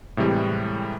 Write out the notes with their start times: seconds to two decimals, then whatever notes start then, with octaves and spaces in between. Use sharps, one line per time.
0.17 A2 C3 E3 G3 G#3